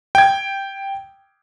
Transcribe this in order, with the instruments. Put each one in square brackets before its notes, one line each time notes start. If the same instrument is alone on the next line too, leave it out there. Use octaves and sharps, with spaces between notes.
[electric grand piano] G5 G#6